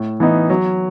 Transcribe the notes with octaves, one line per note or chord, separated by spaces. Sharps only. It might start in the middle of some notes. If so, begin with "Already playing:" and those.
Already playing: A2
E3 B3 D#4
F#3